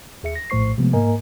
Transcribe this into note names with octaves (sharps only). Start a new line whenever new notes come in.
D#2 G#4 E5 C#7
A#6
A#1 A2 A3 C5 C#6 C7
C3 F3 G#3 A3 B3
G#2 A#3 A#4 D#5 G#5 A#5